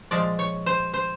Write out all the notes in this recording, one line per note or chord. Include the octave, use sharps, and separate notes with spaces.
A#2 F3 G#3 D5
C#5
C5
C5